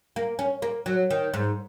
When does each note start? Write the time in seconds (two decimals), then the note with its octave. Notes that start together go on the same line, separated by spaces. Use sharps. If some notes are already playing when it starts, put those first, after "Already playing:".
0.16 A#3
0.39 C#4
0.62 A#3
0.86 F#3
1.10 D#3
1.34 G#2